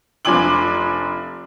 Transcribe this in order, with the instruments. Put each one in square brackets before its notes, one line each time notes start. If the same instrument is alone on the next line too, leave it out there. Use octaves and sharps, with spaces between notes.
[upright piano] F1 F3 D4 G#5 D6 F#7